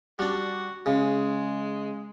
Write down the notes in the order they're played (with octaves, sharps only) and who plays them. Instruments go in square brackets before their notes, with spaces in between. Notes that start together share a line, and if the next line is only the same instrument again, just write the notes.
[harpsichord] G3 D4 [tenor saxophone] F#4
[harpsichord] C#3 [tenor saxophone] G#3